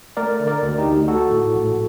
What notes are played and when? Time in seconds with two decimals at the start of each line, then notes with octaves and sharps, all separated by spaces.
0.17 A3 A#4 D5
0.40 D3
0.47 A#4 D5
0.63 D2
0.78 D#4 G4
0.86 D2
1.08 A3 F#4 A4
1.31 A2
1.54 A#1